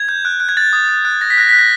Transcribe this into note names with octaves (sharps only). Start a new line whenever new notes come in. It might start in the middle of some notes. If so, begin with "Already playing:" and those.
Already playing: G#6
G6
F#6
F#6
G#6
F#6 A6
D#6
F#6
F#6
F#6 A#6
B6
F#6 A#6
F#6 B6
A#6